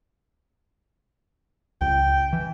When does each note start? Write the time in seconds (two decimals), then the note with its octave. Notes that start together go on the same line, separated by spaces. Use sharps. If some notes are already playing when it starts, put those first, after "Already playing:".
1.81 C#2 G5
2.33 E3